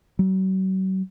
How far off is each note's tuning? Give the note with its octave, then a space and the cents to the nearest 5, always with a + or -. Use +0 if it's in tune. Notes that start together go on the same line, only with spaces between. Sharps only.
F#3 +40